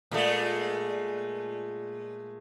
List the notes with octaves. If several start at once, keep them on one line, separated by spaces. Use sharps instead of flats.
A#2 G#3 A3